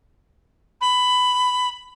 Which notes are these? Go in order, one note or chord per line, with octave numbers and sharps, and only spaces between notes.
B5